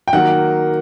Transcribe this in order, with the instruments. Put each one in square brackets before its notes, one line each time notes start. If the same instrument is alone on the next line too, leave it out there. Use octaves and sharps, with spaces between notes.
[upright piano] G5
[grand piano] D#3 F#3 A#3 [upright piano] F#5